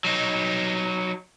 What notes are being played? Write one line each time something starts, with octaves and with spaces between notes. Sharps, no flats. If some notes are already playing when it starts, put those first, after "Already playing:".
F#3 D#4